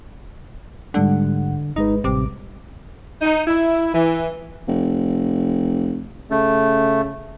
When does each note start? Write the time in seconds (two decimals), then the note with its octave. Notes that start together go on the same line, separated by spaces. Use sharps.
0.94 G#2 D3 G3 F#5
1.76 G#1 G#3 D#4 B4
2.04 A1 C3 G3 D6
3.22 D#4
3.47 E4
3.94 E3
4.67 F1
6.30 C#3 A3